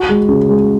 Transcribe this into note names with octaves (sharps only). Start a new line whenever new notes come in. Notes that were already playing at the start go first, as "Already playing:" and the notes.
Already playing: F#4
G#3
C#3
G#3